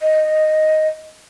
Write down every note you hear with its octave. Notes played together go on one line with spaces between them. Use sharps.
D#5